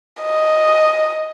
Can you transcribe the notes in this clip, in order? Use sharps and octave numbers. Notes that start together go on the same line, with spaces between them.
D#5